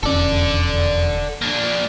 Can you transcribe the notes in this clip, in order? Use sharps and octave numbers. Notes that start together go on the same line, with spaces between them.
E1 F2 C#4 A4 D5
A#3 D4